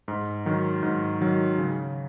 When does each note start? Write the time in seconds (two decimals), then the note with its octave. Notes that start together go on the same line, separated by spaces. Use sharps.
0.08 G#2
0.46 D#3 F#3
0.83 G#2
1.21 D#3 F#3
1.58 C#3